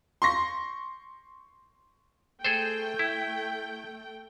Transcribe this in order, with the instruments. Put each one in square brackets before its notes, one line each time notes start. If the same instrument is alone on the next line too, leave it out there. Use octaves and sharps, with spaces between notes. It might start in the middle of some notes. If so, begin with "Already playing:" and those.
[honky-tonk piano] C6 C#6 A#6
[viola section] A3 G5 [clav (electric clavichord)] G#4 A4 C5
[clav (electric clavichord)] E4